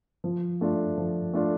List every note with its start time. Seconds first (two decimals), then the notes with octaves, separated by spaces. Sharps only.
0.24 F3
0.61 A3 D4 F4
0.98 F3
1.34 A3 D4 F4